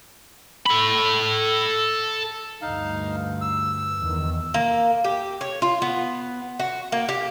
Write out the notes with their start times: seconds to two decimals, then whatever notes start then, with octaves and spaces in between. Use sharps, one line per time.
0.66 A4 B5
2.62 D2 G2 D#4 F5
3.41 E6
4.02 E2 D#3
4.54 A#3
5.04 G4
5.41 C#5
5.62 F4
5.82 B3
6.59 F#4
6.92 A#3
7.09 G4